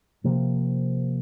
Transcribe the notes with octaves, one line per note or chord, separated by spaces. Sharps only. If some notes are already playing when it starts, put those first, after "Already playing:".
C3 F3 A#3